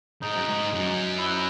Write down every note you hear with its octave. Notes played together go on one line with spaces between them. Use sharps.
G#2 D#4
F#2
G#2
F#2
E4
F#4